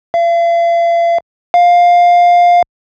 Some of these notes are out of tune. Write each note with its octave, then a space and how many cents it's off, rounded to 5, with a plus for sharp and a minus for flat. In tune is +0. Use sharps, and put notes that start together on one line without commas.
F5 -45
F5 +10